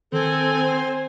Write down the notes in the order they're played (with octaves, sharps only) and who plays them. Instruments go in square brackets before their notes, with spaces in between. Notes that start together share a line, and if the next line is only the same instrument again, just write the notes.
[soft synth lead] D#3 [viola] C4 G#5 [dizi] A4
[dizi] C5